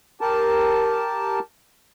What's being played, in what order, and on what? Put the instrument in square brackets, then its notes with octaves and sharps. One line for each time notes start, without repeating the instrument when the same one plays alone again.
[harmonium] G4 A#4 A5